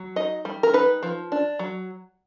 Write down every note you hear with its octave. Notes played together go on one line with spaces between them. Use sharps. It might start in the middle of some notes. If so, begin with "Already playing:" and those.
Already playing: F#3
D#4 D#5
G3
A#4
D#4 B4
F3
D4
F#3